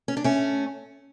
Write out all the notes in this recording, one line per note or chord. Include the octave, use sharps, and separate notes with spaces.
C#4
D4
A3 C#4